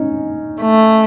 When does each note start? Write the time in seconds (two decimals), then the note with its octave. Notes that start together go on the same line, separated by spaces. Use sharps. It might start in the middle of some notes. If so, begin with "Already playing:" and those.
Already playing: C#4 D#4
0.62 A3